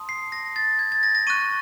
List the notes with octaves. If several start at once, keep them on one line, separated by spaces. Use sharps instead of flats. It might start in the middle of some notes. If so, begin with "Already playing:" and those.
Already playing: A5 C6 D#6
C7
A#6
A6
G#6
A6
A#6
A#6
C#6 F#6 D#7